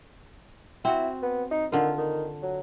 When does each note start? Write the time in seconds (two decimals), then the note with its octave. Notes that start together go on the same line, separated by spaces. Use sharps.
0.85 C4 E4 F#4
1.23 B3
1.51 D#4
1.72 D3 D#3 F4
1.98 D#3
2.43 F#3